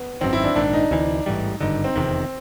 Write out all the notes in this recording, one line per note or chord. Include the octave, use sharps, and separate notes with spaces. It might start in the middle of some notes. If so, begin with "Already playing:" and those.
Already playing: B3
G#1 F#2 D#3 C4
E4
D4
A#1 G#2 D#3 D4
D#4
D2 C3 E3
A1 G#2 E3 G3
G#1 G2 D3 D#4
C4
F1 E2 C3 D#3